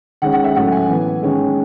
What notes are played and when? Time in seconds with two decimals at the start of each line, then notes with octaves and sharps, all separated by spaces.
0.22 D#3 G#3 C#4 F#5
0.32 F#5
0.44 E5
0.55 A2 F#3 A3 C#4 F#5
0.72 G#5
0.88 E3 B3
1.22 D#3 G#3 C#4